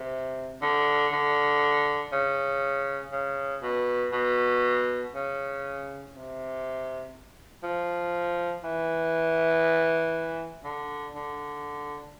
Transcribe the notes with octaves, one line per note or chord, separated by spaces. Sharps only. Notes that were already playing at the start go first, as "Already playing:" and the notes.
Already playing: C3
D3
D3
C#3
C#3
B2
B2
C#3
C3
F3
E3
D3
D3